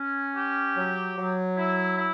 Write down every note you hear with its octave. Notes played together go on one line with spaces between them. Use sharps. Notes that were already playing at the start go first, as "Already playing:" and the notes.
Already playing: C#4
G4
F#3
F#3
E4
E4